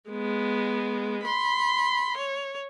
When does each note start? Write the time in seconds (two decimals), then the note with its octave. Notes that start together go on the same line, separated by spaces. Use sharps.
0.10 G#3 B3
1.24 B5 C6
2.17 C#5